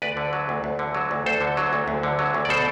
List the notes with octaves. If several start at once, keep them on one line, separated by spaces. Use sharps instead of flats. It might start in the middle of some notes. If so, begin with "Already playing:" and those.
D2 B4 D5
D3
F#3
D2
D2
D3
F#3
D2
D2 A4 C5
D3
F#3
D2
D2
D3
F#3
D2
D5
B2 A4 C5